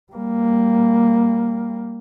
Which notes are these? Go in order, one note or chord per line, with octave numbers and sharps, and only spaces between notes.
G3 A#3